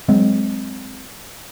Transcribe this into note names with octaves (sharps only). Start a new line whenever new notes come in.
F#3 G#3 C4